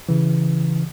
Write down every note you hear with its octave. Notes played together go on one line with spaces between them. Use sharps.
C#3 E3